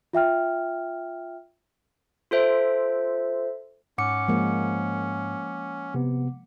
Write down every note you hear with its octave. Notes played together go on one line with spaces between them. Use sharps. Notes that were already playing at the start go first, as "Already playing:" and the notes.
F4 E5 G5 F6
F4 A4 C5 E5
G#2 C#4 F#5 D6 C#7
F3 G#3 A#3
C3 B3